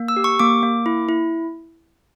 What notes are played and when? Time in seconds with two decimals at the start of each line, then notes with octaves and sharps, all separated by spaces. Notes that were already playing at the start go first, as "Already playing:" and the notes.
Already playing: A#3
0.08 E6
0.17 G4
0.24 C#6
0.39 A#3 D6
0.63 A#3
0.86 E4
1.09 E4